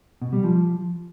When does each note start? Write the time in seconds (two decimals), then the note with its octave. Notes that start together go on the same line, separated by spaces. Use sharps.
0.22 B2
0.33 G3
0.44 F3